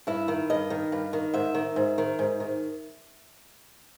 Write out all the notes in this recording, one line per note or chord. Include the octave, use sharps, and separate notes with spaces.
G2 E4
D#3
G2 D#5
D#3
G2
D#3
G#2 E5
D#3
G#2
D#3
G#2
D#3